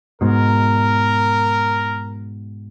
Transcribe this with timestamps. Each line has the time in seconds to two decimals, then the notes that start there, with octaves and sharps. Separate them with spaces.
0.21 G#2 B2 A#4